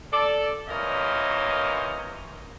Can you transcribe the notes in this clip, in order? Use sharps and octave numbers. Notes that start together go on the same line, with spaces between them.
A4 D5
C3 E3 A#3 A#4 C#5 D#5